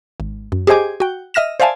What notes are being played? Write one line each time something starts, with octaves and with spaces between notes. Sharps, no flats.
G#1
F#2
G4 G#4 C5 D#5 G#5 D6
F#4 G5
D#5 E5 F6 A#6 E7
C5 D5 E5 F5 G#5 A5